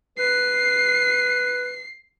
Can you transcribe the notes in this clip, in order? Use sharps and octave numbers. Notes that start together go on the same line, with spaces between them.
B4 C7